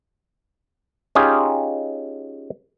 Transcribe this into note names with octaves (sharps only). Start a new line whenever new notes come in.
C#4 D#4 F4 G4 G#4